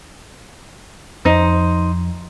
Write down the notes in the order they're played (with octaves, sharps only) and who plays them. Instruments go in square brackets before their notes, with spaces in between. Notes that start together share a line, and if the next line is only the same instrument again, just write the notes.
[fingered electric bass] F2 [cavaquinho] D#4 C5